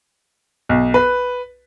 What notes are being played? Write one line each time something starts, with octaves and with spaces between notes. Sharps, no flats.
B1
B4